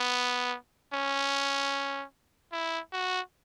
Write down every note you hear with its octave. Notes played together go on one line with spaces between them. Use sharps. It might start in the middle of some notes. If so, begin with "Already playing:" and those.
Already playing: B3
C#4
E4
F#4